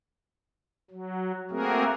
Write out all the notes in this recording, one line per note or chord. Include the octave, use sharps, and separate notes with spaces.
F#3
A3 A#3 C4 F#4 G#4 A#4